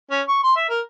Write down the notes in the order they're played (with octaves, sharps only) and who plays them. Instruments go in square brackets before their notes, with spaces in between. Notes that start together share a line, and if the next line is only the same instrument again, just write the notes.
[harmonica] C#4
C#6
C6
E5
A#4